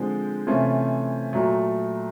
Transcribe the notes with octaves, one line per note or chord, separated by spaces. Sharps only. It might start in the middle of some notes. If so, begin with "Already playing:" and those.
Already playing: D3 F3 G#3 C4
C3 E3 A3 C#4 F4
A#2 F#3 A3